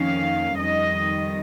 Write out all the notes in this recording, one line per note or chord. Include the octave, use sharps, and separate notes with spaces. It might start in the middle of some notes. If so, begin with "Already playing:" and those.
Already playing: F2 D#3 A#3 C#4 F5
F2 D#3 G3 D#5